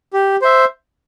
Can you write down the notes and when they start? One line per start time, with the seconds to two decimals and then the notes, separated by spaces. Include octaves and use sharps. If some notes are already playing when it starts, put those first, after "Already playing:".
0.13 G4
0.42 C5 E5